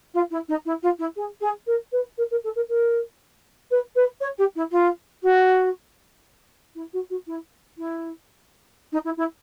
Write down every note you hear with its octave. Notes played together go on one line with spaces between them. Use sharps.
F4
E4
D#4
E4
F4
E4
G#4
G#4
A#4
B4
A#4
A#4
A4
A#4
A#4
B4
B4
C#5
G4
E4
F4
F#4
E4
F#4
F#4
E4
E4
D#4
E4
E4